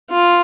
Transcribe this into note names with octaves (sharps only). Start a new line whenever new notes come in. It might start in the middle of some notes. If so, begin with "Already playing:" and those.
F4